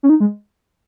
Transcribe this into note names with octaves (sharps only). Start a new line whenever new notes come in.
C#4
D#4
G#3